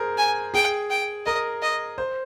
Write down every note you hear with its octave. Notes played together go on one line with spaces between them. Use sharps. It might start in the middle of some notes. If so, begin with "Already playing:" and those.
Already playing: G#4 A#4 C5
G#5
G#4 G5
G5
A#4 D#5
D#5
C5